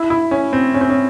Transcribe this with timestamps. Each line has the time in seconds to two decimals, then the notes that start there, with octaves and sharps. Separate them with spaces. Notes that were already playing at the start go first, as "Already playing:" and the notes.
Already playing: E4
0.10 E4
0.31 C#4
0.53 C4
0.74 C#4
0.81 C4
0.90 C#4